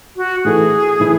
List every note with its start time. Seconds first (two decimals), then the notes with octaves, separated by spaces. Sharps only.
0.17 F#4
0.44 A2 E3 A3 E4 G#4 A4
1.00 A2 E3 A3 E4 A4